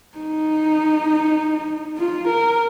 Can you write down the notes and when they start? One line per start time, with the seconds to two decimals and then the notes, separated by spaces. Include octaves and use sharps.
0.18 D#4
1.98 F4
2.28 A#4